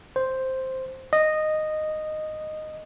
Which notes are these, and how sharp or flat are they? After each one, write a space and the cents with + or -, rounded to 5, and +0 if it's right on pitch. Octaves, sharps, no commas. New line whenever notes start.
C5 +0
D#5 -10